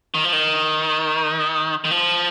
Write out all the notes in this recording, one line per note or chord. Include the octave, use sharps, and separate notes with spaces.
D#3
F3
D#3
D#3
F3